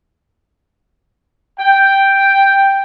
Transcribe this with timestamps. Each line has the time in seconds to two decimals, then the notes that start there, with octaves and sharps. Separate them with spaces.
1.59 G5